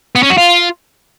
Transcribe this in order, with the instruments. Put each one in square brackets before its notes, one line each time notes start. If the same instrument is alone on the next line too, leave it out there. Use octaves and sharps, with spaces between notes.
[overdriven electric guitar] B3
C#4
F#4
F4